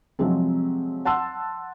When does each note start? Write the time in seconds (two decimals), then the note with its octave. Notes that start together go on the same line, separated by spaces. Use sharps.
0.19 C3 F3 F#3 G#3 C4
1.05 F#5 A5 C6 E6